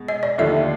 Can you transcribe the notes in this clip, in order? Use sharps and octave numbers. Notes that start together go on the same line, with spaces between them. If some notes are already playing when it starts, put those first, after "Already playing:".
Already playing: B2 G#3
D#5
D5
D#2 D3 F3 A3 E5